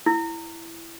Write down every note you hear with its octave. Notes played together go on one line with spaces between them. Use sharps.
E4